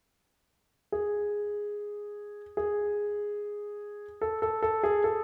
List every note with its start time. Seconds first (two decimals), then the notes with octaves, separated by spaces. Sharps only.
0.92 G#4
2.57 G#4
4.21 A4
4.42 A4
4.62 A4
4.83 G#4
5.04 A4